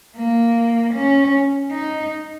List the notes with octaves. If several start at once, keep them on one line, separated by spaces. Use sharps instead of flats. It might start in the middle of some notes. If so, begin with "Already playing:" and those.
A#3
C#4
D#4